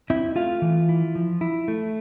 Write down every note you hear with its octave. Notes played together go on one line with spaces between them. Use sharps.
C4 E4 E5
A3 F4 F5
E3
E4
F3
E4
A3